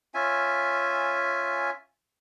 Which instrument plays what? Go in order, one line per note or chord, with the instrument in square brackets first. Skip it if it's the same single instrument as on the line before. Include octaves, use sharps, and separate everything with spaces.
[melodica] C#4 F4 E5 G#5